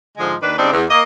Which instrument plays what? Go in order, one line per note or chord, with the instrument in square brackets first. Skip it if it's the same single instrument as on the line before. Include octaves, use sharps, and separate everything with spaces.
[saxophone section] G#2 D3 F3 G#3
D#2 D#3 D4 B4
C#3 G3 C4 D4 D#4
E2
A#3 D#5